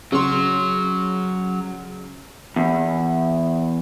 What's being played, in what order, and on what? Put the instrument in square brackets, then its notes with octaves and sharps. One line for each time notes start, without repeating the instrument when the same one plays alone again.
[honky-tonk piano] C#3 C6 [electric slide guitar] F#3
[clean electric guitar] E2